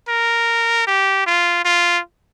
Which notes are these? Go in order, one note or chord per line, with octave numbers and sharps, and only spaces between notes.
A#4
G4
F4
F4